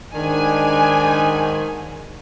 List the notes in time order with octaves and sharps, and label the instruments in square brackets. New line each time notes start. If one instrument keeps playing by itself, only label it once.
[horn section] G#2 D#3 [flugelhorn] D4 [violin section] G#5